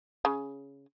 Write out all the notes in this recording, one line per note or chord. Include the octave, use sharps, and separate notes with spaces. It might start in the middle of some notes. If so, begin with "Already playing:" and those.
C#3